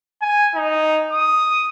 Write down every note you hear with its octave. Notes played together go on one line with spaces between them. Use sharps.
G#5
D#4
D#6